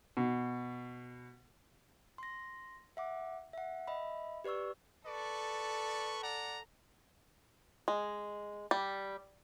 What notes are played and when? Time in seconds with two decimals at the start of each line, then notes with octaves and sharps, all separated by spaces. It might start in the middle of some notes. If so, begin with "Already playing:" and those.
0.17 B2
2.18 C6 A#6
2.97 E5 F#5 D6
3.53 E5 F#5
3.87 D#5 E5 B5
4.44 G4 B4 D5 C#6 E6
5.06 A4 B4 D5 C#6
6.22 D5 F#5 A#5
7.88 G#3
8.71 G3